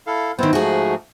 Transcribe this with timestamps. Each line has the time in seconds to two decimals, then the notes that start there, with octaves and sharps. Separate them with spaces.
0.07 E4 A4 F5
0.39 D#3 B3 C4 E4 C5
0.53 G#2 F3 A3 F#4 G#4